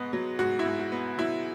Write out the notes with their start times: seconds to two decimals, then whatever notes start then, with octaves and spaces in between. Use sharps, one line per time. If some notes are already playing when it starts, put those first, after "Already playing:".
Already playing: G#2 B3 D#5
0.13 F#3
0.39 G#2 F#4
0.59 E4
0.66 G#2
0.79 F#4
0.92 B3
1.18 F#3 E4